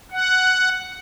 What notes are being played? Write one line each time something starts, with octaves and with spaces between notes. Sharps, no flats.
F#5